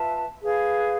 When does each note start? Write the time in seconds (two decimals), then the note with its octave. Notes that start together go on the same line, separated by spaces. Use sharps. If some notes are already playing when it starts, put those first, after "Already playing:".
Already playing: F4 B4 E5 A5
0.42 G#4 B4 F5